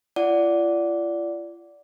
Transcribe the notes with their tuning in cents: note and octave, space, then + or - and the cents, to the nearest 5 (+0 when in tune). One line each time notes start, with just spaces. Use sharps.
F4 -40 D5 -15 F#5 +0